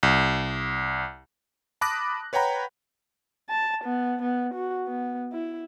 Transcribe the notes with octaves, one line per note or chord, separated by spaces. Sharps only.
C2
A5 B5 D6 D#6 F#6 A#6
B4 C#5 F#5 G5 A#5 B5
A5
B3
B3
F#4
B3
E4